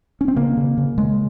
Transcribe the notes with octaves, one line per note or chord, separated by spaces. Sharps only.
C#4
C4
C#3 A#3
C#3
C#3
C#3 G#3